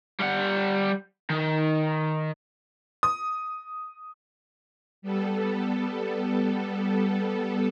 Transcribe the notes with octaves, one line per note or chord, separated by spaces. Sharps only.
G3 F#5
D#3
D#6
G3 B3 A4